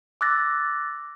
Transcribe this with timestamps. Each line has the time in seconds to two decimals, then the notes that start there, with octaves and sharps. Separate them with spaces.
0.21 D6 E6 F#6 A6 A#6